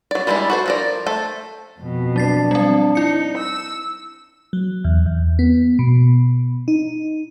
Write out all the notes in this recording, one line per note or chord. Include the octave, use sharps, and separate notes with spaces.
F#3 D5
G3 G#3 B3 D4 E4
F#4 A4 C5
F3 A#4 D5
A3 A4 C5
F2 B2
F#3 D4 A6 C7
G3 C4
D#4 E4 C#7
E6
F#3
E2
E2
B3
B2
D#4